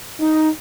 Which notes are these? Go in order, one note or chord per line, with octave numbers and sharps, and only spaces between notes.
D#4